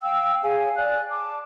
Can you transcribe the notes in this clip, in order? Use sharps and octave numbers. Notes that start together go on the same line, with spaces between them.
F5 G5 E6
G#4 C#5 F5 G#5
D5 G#5 F#6
A5 D6